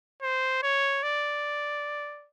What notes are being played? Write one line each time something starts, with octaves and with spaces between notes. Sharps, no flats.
C5
C#5
D5